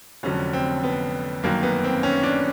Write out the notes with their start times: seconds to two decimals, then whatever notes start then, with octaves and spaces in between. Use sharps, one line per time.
0.23 F1 F2 D3 F#3 C#4
0.53 C4
0.83 B3
1.43 G1 F#2 D#3 F#3 A#3
1.63 B3
1.84 C4
2.03 C#4
2.23 D4